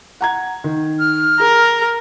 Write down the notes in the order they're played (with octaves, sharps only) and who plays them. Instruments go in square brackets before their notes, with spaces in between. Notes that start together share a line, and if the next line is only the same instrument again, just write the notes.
[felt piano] F#5 A#5 G#6
D#3
[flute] F6
[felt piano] G#4 [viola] A#4